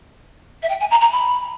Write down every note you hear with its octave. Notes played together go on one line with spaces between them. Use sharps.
E5
G5
G#5
A#5
A#5
B5